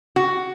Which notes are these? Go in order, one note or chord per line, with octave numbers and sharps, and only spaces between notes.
F#4